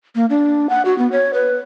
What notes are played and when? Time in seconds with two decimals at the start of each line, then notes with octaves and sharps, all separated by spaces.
0.15 A#3
0.30 D4
0.70 F#5
0.85 F#4
0.98 B3
1.12 C#5
1.34 B4